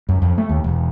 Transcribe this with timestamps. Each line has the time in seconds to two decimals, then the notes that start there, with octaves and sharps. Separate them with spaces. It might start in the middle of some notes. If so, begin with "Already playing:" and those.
0.09 F#2
0.22 F2
0.38 A3
0.49 D#2
0.64 E1